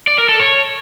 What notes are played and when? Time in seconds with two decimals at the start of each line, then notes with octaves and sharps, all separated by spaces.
0.07 D5
0.18 A#4
0.29 A4
0.39 C#5